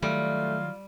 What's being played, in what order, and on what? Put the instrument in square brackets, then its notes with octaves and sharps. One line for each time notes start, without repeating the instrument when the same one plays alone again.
[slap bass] D#3 F#3 [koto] G3 [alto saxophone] A3 [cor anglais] F4